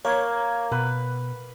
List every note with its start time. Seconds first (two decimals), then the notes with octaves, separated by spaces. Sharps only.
0.05 A#3 C#5 G#6
0.72 B2 B4